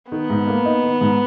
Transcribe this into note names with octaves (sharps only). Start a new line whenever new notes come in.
D#3 B3
G#2
A#3
D#4
D#3
G#2